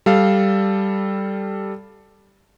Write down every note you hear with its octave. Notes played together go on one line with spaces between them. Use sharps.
G3 A4 F5